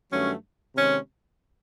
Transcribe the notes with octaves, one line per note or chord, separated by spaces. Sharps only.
G2 D#3 F#3 A3 C#4
C3 D#3 G#3 C#4